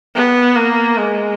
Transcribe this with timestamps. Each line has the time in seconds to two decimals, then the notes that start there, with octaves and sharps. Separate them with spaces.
0.15 B3
0.56 A#3
0.97 G#3